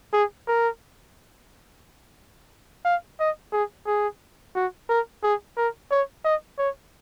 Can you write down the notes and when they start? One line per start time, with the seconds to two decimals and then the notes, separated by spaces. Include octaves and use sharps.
0.13 G#4
0.48 A#4
2.85 F5
3.20 D#5
3.53 G#4
3.87 G#4
4.56 F#4
4.89 A#4
5.24 G#4
5.57 A#4
5.91 C#5
6.25 D#5
6.59 C#5